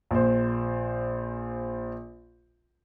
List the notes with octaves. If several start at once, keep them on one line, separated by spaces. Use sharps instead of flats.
A#1 C5